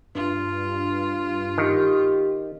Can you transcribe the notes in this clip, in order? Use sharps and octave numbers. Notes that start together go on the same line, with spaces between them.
G2 F4
D#3 G4